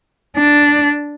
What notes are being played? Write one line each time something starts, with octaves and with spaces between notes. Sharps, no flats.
D4